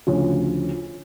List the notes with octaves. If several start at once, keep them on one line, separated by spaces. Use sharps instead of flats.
D2 C#3 F3